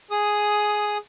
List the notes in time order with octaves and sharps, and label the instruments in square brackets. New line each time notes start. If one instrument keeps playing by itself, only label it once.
[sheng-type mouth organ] G#4 D#6